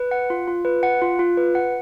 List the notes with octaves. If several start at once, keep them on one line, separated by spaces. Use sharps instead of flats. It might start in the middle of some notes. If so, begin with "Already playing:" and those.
Already playing: B4
F#5
F4
F4
B4
F#5
F4
F4
B4
F#5